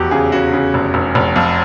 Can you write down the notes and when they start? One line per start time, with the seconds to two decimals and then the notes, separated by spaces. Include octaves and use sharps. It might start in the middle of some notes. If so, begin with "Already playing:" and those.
Already playing: F1 E2 F#4 G4
0.11 C#3 G#4
0.32 C#3 F#4
0.53 C#3
0.74 F1
0.94 F1
1.15 F1
1.36 F2